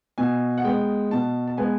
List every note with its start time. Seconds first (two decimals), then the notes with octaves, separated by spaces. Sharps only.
0.18 B2 G#5
0.58 F#5
0.64 G#3 B3 G5
1.11 B2 A5
1.48 A5
1.58 G#3 B3 G#5